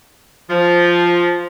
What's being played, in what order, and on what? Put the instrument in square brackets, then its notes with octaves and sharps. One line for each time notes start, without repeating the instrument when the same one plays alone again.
[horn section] F3